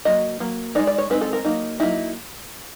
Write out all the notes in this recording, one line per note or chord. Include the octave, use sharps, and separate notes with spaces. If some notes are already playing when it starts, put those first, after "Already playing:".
F#3 A#3 D#5
F#3 A#3
G#3 C4 D#4 D5
D5
C#5
G#3 C4 D#4 B4
A4
A#4
F#3 A#3 D#4
F#3 A#3 D#4 E4